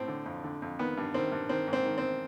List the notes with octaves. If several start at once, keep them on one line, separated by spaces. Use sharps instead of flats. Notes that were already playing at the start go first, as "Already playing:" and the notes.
Already playing: A2 C4
D3
F2
D3
F2
D#3 B3
G2
D#3 C4
G2
D#3 C4
G#2
C4
D#3
C4